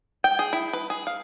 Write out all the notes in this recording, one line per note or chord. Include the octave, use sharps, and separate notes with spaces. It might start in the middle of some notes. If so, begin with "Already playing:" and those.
G5
G#4
E4
B4
G#4
F5